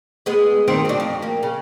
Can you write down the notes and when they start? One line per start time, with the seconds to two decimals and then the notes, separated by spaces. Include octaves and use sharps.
0.26 G#3 B3 G#4
0.68 G2 D#3 C4
0.85 F#3 D4
1.00 F2
1.22 A#3
1.43 C#3